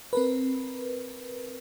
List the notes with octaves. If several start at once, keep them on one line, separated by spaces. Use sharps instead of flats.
C4 A#4 B4